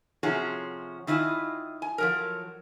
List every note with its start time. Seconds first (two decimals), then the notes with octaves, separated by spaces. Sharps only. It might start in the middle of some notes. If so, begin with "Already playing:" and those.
0.23 C3 F3 C#4 F#4 G#4
1.07 D#3 E4 F4 D#5 F5 G#5
1.82 G#5
1.98 F3 F#3 A#4